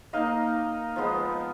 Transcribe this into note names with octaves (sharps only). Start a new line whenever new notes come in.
A#3 D#4 D#5 F5
F3 G#3 B3